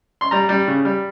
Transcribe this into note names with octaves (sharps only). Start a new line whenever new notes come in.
C6
G3 A#5
G3
C#3
G3